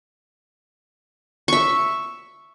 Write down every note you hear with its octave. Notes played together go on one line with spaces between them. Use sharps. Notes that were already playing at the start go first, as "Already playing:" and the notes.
E5 C#6